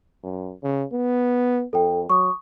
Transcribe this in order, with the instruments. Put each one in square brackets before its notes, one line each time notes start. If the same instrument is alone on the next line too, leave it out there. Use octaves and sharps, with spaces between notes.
[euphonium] F#2
C#3
B3
[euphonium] F2 [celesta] A4 G5
[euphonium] F#3 [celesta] C#6 D#6